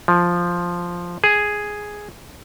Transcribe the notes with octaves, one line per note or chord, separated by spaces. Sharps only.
F3
G#4